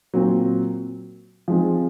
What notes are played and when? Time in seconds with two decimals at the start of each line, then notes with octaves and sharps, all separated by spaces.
0.14 A#2 F#3 C4
1.48 F3 G#3 C4